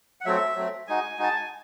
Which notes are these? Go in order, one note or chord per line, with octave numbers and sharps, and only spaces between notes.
F#5
F#3 A3 C4 E5
F#3 A3 C4
G#3 D#4 F#4 G#5
G#3 D#4 F#4 A5
G#5